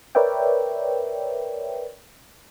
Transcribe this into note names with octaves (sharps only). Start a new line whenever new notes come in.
A#4 B4 C#5 D5 E5 G5